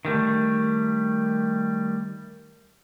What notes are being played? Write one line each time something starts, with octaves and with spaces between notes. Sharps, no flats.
D#3 G3 A3